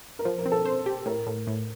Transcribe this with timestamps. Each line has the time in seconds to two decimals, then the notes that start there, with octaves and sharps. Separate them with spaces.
0.19 A#4
0.25 F3 C5
0.39 A#4
0.46 C4
0.52 A4
0.65 C5
0.86 G4
1.06 A2 A#4
1.27 A2
1.47 A2